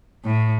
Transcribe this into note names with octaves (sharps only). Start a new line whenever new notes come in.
A2